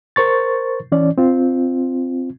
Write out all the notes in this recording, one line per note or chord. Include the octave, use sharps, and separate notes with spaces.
A#4 C5 C#6 A6
E3 C#4 D5
C4 F4